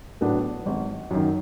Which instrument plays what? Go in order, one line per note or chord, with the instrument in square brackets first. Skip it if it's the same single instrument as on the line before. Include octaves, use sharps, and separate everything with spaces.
[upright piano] A2 F#3 B3 D4
G#1
F#2 D#3